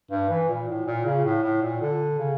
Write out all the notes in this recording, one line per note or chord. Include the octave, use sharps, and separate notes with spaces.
G2
E3
A#2
A2
A#2
C#3
A2
A2
A#2
D3
C#3